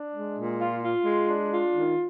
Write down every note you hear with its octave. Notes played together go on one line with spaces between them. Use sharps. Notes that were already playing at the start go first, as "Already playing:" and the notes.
Already playing: D4
G#3
A#2
F4
F4
G#3
D4
F4
D#3